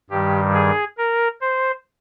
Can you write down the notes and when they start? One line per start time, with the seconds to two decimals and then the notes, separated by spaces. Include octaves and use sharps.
0.10 G2 D#3 G3 G4
0.54 G#4
0.98 A#4
1.41 C5